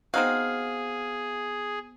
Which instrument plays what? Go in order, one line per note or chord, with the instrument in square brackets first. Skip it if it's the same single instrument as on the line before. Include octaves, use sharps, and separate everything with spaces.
[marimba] B3 C5 [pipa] C4 D#4 F#4 [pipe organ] G#4 [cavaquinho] F5